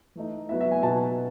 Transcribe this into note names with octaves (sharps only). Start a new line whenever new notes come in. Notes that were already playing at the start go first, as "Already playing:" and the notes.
E3 A3 D#4
F#3 B3 E4 E5
E5
G#5
B2 F#3 B3 D#4 A5